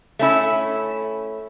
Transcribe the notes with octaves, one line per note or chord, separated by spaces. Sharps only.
A3 C#4 E4